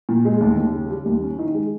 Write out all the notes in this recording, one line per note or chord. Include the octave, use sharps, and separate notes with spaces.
A#2
G#3
D#2
D#2
C#3
G3
D#2
C#4
D#3
G#3